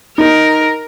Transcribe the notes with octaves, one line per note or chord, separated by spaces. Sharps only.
D#4 A#4